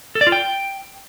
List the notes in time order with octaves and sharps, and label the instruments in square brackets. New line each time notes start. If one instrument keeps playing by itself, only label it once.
[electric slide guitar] A4
D5
F4
G5